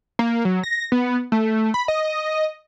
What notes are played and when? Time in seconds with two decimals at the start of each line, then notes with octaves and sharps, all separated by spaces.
0.19 A#3
0.45 F#3
0.63 A#6
0.92 B3
1.32 A3
1.74 B5
1.88 D#5